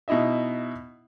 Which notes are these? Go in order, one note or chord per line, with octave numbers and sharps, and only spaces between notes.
B2 D#4 E4 D#5 E5